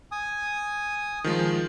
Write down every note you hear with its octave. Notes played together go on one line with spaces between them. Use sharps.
G#5 D#6
D#3 F3 G#3